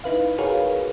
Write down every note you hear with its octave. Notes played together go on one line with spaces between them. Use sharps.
D#4 E4 B4 F5
F#4 G#4 A#4 B4 C#5 F5